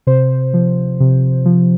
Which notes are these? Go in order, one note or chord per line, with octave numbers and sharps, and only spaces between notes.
C3 C5
F3
C3
F3